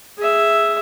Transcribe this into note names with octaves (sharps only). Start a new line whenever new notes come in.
G#4 E5